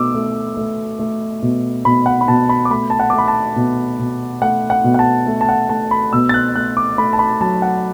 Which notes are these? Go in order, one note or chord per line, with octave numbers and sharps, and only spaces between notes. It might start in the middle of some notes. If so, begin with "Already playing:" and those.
Already playing: B2 A3 D6 E6
A3
A3
A3
B2
B2 B5
F#5
B5
B2 A5
B5
D6
A3 B5
A5
F#5
A3 D6
B5
A5
B2
B2
A3 F#5
F#5
B2
F#5
A5
A3
A5
F#5
A3 A5
B5
B2 E6
A6
F#6
A3 F#6
D6
A3 B5
A5
B5
F#3 A5
F#5